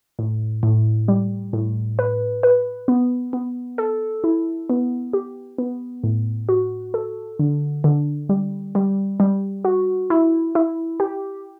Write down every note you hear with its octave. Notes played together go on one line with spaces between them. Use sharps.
A2
A2
G3
A2
B4
B4
B3
B3
A4
E4
B3
G4
B3
A2
F#4
A4
D3
D3
G3
G3
G3
F#4
E4
E4
G4